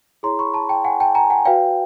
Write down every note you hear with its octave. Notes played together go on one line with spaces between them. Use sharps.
E4 G#4 C#5 A#5 C6
B5 C#6
A5 B5
G5 A5
F#5 G#5
G5 A5
G#5 A#5
F#5 G#5
F#4 B4 D5 F5 G5